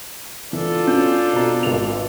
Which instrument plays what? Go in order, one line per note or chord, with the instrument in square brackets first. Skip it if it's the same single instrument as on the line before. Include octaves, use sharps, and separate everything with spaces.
[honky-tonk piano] E3 [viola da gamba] D4 F4 A4
[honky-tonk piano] C#4 F#4 G6
B2 C4 A#5
G#1 B4 F7